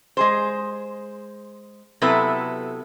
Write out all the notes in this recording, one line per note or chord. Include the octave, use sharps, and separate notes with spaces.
G#3 G#4 C5
C3 F#3 B3 E4 A4 B4